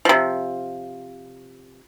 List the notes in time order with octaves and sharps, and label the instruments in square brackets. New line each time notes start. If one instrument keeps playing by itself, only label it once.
[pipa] C3 F3